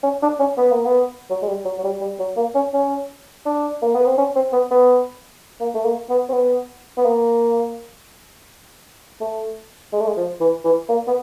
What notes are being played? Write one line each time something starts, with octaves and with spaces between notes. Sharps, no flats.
C#4
D4
C#4
B3
A#3
B3
F#3
G#3
G3
F#3
F#3
G3
G3
F#3
A#3
C#4
C#4
D4
A#3
B3
C4
C#4
C4
B3
B3
A#3
A3
A#3
B3
C4
B3
B3
A#3
A3
G#3
A3
G#3
F3
E3
E3
A#3
B3